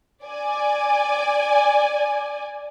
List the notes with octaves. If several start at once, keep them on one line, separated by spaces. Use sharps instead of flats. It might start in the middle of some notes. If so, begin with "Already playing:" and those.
D5 G#5